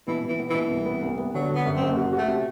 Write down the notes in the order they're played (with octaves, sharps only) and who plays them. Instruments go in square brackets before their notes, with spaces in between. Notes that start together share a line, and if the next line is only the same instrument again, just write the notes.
[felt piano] B2 [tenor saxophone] E3
[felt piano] B2 [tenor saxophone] E3
[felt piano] B3
[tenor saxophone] E3
[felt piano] B2
C2
B3
C2
B3
[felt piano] D3 [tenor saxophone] F#3
[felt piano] D3
[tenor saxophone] B3
[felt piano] F#2
[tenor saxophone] C4
[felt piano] F#1
F#4
F#4
[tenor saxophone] A3
[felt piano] C3